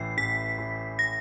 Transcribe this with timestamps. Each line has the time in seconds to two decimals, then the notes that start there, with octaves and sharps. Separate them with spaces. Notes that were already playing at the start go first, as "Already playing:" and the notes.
Already playing: A1 A2 E3 C7
0.17 A1 B6
0.58 A2 E3
0.99 A#6